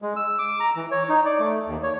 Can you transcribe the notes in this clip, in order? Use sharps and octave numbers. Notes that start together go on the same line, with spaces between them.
G#3
E6
D6
A#5
E3
C#5
D#4
D5
A3
D#2
C#5